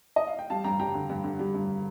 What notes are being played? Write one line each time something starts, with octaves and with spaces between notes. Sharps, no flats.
D#5
F5
G5
G3 F5 A5
G2 G5 A#5
G3 G5 A#5
D3
G2
D3
G3
G2